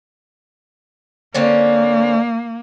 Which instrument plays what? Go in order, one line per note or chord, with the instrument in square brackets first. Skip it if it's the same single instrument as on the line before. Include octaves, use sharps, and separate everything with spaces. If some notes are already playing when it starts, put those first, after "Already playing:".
[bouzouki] D3 C4 C#4 [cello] A#3